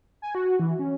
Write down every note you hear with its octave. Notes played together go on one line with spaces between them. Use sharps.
G#5
F#4
E3
C#4